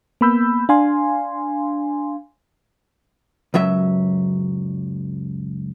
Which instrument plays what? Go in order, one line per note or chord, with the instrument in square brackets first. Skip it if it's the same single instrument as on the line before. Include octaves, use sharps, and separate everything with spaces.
[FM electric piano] A#3 B3 B5 E6 G6
D4 F5 G#5 C6
[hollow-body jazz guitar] C#2 F#2 F#3 E5